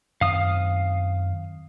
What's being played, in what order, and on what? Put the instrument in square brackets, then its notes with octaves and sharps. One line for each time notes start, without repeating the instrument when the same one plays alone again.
[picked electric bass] F#2 D#3 C4 [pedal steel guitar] F5 D#6